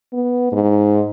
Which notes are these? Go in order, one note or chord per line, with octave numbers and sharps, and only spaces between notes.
B3
G#2